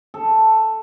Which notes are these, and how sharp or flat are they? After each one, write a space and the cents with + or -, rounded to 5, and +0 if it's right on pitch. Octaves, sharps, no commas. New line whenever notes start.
A4 +0